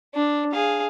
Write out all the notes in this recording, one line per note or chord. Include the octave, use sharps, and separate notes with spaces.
D4
G#4 F5